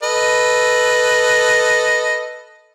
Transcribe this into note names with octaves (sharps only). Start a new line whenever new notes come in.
A4 B4 D#5